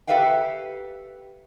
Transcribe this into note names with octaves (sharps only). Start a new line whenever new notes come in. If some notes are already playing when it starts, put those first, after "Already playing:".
G4 A4 B4 E5 F5 G5